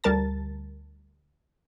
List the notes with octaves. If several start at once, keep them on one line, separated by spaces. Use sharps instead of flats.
D2 G3 A#4 A5 A6